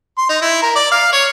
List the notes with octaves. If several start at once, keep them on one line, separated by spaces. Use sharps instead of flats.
C6
D#4
E4
A#4
D5
F5
C#5